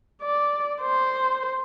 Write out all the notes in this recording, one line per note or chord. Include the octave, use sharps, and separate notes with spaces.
D5
C5